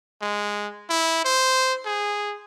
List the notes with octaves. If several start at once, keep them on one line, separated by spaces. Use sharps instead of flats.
G#3
E4
C5
G#4